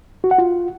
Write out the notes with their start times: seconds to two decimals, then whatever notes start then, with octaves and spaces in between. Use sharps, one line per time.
0.24 F#4
0.31 F#5
0.38 F4